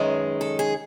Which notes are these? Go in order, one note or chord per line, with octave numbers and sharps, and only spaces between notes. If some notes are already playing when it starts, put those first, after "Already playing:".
Already playing: F#2 D#3 G#3 C#4 B4
A4
G#4